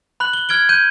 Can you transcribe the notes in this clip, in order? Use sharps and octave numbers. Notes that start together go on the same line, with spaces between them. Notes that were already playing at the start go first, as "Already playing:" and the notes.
B5 F#6 F#7
G7
F6 G#6 D7 G7
G6 D#7